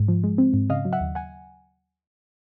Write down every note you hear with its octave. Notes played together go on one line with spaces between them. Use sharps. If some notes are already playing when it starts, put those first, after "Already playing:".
Already playing: G#2
F3
G#3
C4
G#2
C#3 D#5 F5
F#3
E5 F#5
D#2
F#5 G#5